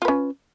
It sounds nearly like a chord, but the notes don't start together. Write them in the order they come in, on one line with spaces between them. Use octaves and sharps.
F4 B4 C#4